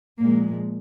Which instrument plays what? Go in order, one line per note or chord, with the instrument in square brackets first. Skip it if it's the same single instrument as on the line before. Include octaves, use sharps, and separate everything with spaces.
[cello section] A#2 F3 G#3 A#3